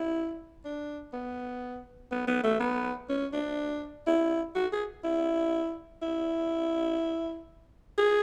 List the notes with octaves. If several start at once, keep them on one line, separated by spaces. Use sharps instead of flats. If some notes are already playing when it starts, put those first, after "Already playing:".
Already playing: E4
D4
B3
B3
B3
A3
B3
C#4
D4
E4
F#4
G#4
E4
E4
G#4